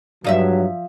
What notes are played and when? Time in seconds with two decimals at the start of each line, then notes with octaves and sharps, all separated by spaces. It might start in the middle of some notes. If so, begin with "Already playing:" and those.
0.24 G2 F3 F#3 D#5 E5